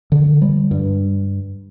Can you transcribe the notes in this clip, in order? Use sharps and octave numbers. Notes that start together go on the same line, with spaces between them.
D3
G3
G2